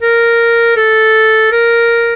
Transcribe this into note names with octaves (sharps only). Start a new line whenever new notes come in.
A#4
A4
A#4